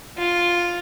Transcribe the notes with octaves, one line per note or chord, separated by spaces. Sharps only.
F4